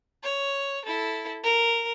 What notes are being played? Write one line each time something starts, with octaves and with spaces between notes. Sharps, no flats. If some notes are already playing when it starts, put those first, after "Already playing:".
C#5
E4 A4
A#4